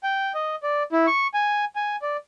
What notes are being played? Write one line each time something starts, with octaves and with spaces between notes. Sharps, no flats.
G5
D#5
D5
E4
C#6
G#5
G#5
D5